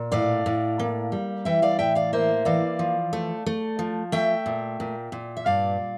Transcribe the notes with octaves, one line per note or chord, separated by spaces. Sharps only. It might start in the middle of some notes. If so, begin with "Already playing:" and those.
Already playing: A#2
A2 D5 F5
A2
A#3
G3
E3 E5 G5
D5 F5
A2 E5 G5
D5 F5
A#3 C5 E5
E3 D5 F5
F3
A3
A3
F3
A3 E5 G5
A#2
A#2
A#2
E5
G2 D5 F5